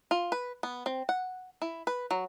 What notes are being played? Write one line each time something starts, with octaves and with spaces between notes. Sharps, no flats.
F4
B4
B3
C4
F#5
E4
B4
F#3